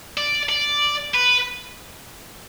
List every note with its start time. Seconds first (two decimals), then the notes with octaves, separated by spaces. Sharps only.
0.17 D5
0.49 D5
1.14 B4